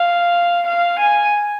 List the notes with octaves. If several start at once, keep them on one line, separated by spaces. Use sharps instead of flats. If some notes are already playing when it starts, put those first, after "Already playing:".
Already playing: F5
F5
G#5